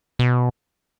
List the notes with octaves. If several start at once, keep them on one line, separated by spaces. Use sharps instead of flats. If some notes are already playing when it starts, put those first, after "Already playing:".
B2